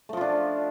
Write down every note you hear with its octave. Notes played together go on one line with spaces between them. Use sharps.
F3 A3 D4 F4